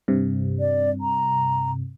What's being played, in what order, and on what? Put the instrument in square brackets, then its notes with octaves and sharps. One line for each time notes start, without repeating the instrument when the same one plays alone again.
[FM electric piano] G2 C3
[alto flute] D5
A#5